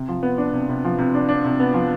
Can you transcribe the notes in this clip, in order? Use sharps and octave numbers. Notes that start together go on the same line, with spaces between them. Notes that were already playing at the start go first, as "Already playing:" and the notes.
Already playing: C3
F3
B3
D4
C3
C3
F3
C3
D4
D4
C3
B3
F3